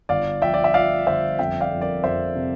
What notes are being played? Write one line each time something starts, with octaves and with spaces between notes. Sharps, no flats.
G1 D5 F5
F3 E5 G5
D5
E5
F3 D5 F5
G1 C5 E5
F2 E5 G5
D5 F5
F2
A#4 D5
F2 C5 E5
C3